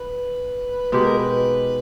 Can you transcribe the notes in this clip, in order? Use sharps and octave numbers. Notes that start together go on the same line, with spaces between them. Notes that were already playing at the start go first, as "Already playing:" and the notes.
Already playing: B4
B2 G#3 D#4 G4 B4
A#4
B4